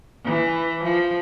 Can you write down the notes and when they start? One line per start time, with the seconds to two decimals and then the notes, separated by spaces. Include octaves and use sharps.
0.25 E3
0.84 F3